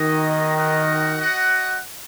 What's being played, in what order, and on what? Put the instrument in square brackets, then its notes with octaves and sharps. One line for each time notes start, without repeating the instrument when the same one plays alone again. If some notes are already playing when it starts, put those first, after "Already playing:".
Already playing: [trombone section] D#3 [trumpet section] A#3 F#4 D#5
[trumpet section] D#4 F#4 A#4 D#5 F#5
F#4 D#5 F#5